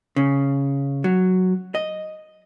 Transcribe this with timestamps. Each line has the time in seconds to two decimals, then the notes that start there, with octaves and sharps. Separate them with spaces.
0.16 C#3
1.04 F#3
1.75 D#5